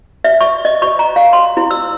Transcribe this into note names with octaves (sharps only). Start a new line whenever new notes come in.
E5
C#6
D#5
C#6
A#5
F5
C6
E4
E6